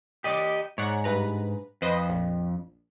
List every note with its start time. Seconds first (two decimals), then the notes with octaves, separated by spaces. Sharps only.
0.24 G4 D5 D#5 D6
0.78 G#2 C#5 D5 F#5
1.04 G2 B4 A#5
1.82 F2 B4 C5 D#5
2.09 A#1